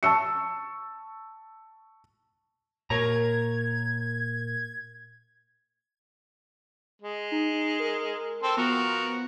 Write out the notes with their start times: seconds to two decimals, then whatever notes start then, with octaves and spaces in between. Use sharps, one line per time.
0.03 A5 C#6 E6 C#7
2.90 A#2 A#4 C#5 A#5 G#6
7.02 G#3
7.32 D#4
7.80 A#4
8.43 C4 A4 C6
8.57 F3 B3 F#4 A#4